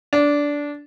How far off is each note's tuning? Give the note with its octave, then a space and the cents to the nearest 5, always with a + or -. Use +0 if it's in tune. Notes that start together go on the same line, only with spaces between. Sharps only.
D4 -15